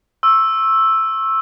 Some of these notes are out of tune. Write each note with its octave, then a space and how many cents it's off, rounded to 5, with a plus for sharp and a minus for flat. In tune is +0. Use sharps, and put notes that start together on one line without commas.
C#6 -35 E6 +0